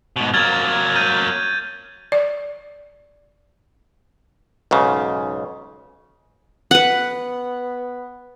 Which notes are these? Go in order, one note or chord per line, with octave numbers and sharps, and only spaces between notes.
G#2 B2
F#3 A#3 F6 G#6 A6
G6 A6 D#7
D5
B1 G#2 C#3
B3 B4 F#5